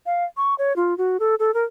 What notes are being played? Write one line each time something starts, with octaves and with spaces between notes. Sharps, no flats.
F5
C#6
C#5
F4
F#4
A4
A4
A#4